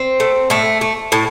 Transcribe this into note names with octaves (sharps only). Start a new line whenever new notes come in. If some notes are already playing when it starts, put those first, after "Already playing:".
Already playing: C4
A3
A2 A3
A3
A2